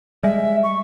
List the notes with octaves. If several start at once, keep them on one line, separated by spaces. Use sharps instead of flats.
G3 G#3 E5
C#6